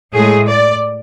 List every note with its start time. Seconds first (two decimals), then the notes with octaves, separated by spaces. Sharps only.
0.13 A2 G#3 G#4
0.48 D5